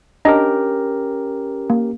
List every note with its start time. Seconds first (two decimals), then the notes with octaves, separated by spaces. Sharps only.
0.25 C#4 D4 G4 A#4 D#5 A#5
1.70 A#3